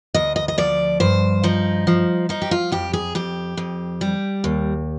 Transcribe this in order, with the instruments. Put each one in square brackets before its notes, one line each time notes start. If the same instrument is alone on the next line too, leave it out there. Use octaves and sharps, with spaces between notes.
[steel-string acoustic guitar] D2 D#5
D#5
D#5
F3 D5
G2 C5
F3 D#4
F3
F3 D#4
G4
F4
F2 G4
G#4
F2 G4
F2
G3
D#2